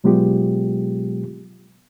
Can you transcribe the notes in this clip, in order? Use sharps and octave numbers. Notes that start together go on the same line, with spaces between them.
B2 F#3 G#3 B3 F4 G4